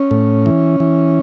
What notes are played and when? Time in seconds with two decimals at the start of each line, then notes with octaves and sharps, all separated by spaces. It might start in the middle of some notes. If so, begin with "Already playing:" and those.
Already playing: C#4
0.11 A2
0.46 E3
0.80 E3